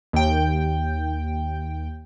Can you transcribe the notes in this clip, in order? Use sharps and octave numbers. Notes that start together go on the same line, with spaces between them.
D#2 G5